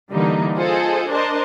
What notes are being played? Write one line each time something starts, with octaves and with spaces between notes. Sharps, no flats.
D3 E3 G3 A#3 D#4
F4 G#4 A4 C5 D#5
D4 A#4 C5 D#5 A5 C6